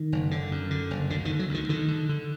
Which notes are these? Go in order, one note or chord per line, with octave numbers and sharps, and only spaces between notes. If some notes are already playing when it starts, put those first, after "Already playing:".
Already playing: D#3
F#1
D3
F#2
D3
F#1
D2 D3
D#3
D3
F#3
D2
D#3
D3 D#3
D3
D3